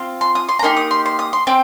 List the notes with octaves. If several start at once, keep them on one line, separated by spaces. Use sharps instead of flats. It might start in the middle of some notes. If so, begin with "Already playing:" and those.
Already playing: C4 F4
C6
D#6
C6
A#5
A#3 D#4 G4 C6
D#6
C6
C6
D#6
C6
C4 G5